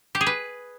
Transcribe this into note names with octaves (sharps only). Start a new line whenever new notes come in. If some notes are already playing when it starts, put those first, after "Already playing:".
G4
G#4
B4